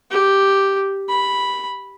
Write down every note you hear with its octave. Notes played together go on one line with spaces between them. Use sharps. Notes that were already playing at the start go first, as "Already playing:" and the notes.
G4
B5